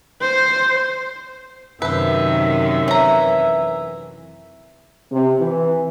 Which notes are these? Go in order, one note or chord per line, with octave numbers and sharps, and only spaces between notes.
C5
F#2 C3 D#3 B4 C5 E5
E3 C#4 A#5
C3
E3